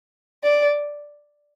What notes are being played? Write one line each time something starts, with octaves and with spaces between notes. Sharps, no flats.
D5